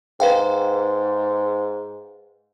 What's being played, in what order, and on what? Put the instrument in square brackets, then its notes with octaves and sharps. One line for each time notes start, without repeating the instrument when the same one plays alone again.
[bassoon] G#2 [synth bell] B4 F5 G5